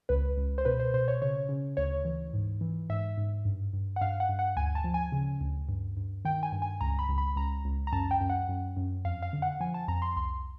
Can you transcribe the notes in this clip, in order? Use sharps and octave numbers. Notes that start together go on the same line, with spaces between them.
C#2 B4
C#2
C5
B2 B4
C5
B2 C5
C#5
C#3 C#5
C#3
D2 C#5
E3
G#2
E3
G#2 E5
G#2
G2
G2
F#5
G2 F5
F#5
G2
F#5
D2 G#5
A5
F3
G#5
C#3
D2
G2
G2
D#3 G5
G#5
G2
G#5
C#2 A#5
B5
C#2
B5
C#2 A#5
C#2
A#5
F#2 A5
G5
F#2
F#5
F#2
F#2
F2 F5
F5
D3
F#5
F3 G#5
A5
F2 A#5
C6
C2 C6